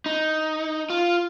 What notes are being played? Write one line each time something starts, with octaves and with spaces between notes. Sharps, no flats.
D#4
F4